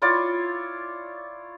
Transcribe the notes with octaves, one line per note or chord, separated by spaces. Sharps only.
E4 F4 C#5 D5